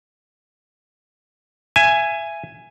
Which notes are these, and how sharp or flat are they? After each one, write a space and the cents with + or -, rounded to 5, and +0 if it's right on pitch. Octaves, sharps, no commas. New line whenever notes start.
E5 +25 G#5 +0